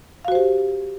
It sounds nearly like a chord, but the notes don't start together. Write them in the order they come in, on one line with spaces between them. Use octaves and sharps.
F5 F#4 C5 G4